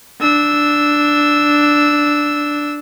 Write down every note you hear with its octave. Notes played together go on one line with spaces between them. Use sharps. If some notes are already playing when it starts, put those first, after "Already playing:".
D4 E6